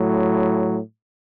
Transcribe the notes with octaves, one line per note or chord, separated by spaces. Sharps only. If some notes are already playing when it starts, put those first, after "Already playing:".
Already playing: A2 F#3